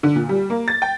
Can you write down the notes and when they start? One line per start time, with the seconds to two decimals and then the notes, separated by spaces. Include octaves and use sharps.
0.03 D3
0.16 A#2
0.29 G3
0.50 A#3
0.68 A6
0.82 G5